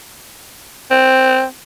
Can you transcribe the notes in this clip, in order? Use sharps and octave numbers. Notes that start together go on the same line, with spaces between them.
C4